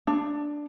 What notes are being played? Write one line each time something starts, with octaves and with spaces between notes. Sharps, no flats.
D4